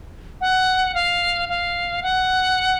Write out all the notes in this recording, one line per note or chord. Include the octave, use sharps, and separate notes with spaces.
F#5
F5
F5
F#5